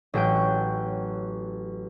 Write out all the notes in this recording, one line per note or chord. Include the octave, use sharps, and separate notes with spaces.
A1 F#3 C#5 F#5 G5 D7